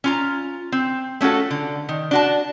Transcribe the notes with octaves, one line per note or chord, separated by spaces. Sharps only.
C#4 F4 A#5
C4
A3 C#4 F4 F#4 A4
D3
D#3
D4 F#4 A5